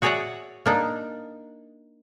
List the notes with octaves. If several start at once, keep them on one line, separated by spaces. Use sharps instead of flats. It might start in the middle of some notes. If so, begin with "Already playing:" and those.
F#4 G#4 C#5 D5 E5 F#5
A#3 D4 D#4